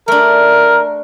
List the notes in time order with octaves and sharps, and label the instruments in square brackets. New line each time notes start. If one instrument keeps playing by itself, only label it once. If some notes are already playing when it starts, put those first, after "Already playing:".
[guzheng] A3 D4 [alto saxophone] A#4